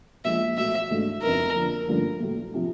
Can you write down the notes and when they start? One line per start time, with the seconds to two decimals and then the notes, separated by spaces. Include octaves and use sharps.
0.25 A#2 F3 G#3 E5
0.57 B2 F#3 A3 E5
0.90 G#2 E3 A3 D4 F#4
1.22 F2 C#3 F#3 B3 D#4 A#4
1.55 D3 F3 A#3
1.87 G2 D3 F3 A3 C#4
2.20 A2 F#3 A3
2.54 C3 F3